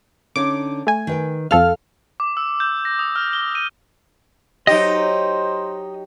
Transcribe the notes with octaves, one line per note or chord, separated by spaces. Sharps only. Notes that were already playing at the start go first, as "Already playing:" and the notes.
D3 C#4 D#4 D6
A3 G#5
D#3 B4 G5
F2 A4 F5 F6
D6
E6
G6
A#6
D#6
F6
G7
D#7
F#3 D#4 G4 C5 D#5